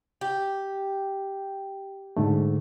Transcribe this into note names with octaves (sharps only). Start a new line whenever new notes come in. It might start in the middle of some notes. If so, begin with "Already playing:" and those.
G4
G#2 D3 A3